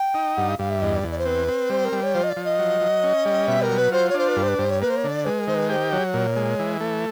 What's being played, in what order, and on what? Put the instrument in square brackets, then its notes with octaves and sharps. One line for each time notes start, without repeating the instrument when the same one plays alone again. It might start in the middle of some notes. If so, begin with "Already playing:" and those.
Already playing: [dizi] G5
[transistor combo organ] D#4
[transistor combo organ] G2 [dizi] F#5
[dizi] F5
[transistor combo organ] G2 [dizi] F5
[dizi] E5
[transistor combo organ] E2 [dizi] D#5
[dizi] D5
[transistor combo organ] E2
[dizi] D5
C5
[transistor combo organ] C4 [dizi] B4
[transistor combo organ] C4
[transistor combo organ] G3 [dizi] C5
[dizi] A#4
[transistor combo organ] G3
[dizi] C#5
[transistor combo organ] F3 [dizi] C5
[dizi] D#5
D5
[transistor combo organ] F3
[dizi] D#5
[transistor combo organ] F#3
F#3
C#4
G3
[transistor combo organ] B2 [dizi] E5
[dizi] A#4
[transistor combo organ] F#3
[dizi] B4
[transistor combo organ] F4 [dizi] C5
[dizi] C#5
[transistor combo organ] D4 [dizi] C5
[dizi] B4
[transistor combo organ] G2 [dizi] A#4
[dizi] C5
B4
[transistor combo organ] G2 [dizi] C5
[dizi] C#5
[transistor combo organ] A#3 [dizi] B4
[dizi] C5
C#5
[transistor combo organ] D3
[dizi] D5
[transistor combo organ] G#3 [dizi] B4
[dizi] A#4
[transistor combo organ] D#3 [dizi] C5
[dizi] B4
[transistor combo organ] G4 [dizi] C5
[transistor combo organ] F#3 [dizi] C#5
[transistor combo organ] A#2
G#3
E3
A3